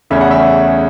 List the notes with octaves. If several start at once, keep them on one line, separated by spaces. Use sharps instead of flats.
E2 C#3 A3 C#4 E5
F#5
E5